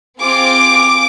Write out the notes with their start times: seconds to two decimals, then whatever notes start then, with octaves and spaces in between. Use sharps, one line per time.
0.20 C4 F4 G#4 D6